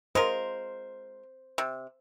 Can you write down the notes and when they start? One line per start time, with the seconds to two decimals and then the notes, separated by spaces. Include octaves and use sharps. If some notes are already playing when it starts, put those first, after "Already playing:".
0.15 G#3 F4 A#4 C5
1.58 C3